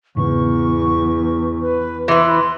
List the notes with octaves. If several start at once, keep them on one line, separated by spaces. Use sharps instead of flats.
E2 G#2 C#3 B3 C#6
B4
E3 B4 C6